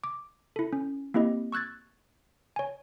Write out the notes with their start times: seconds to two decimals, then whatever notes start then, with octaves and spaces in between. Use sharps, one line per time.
0.04 D6
0.56 E4 A4
0.73 C#4
1.14 A#3 C4 E4 G4 D#5
1.52 C#6 E6 F#6 G#6 A6
2.56 C#5 G#5